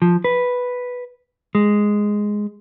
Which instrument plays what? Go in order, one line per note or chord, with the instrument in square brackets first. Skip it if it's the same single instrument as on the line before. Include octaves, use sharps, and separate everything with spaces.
[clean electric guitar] F3
B4
G#3